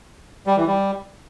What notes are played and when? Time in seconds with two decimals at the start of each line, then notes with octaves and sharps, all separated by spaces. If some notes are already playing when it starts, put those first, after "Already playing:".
0.47 G3
0.57 E3
0.67 G3